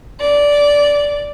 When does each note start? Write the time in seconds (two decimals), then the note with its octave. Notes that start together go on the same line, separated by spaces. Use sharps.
0.20 D5